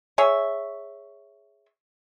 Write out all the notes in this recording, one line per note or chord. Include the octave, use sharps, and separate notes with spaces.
G#4 C#5 E5